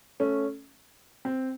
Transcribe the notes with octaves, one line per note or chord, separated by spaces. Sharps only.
A3 C#4
C4